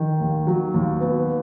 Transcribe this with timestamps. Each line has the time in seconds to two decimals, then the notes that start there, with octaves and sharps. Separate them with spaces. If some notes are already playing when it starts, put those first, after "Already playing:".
Already playing: D#3
0.20 D#2
0.47 F#3
0.74 D#2
1.00 B3